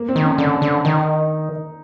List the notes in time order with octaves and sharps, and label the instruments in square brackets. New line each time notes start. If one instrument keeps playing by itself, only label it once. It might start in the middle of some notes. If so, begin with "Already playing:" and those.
Already playing: [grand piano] A#3
C4
[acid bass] D#3
[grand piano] C#4
[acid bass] D3 [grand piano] D4
[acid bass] D3
[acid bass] D#3 [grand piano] D#4